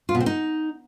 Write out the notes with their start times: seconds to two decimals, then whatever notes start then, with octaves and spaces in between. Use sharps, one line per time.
0.09 F4
0.15 B2
0.20 C4
0.26 D#4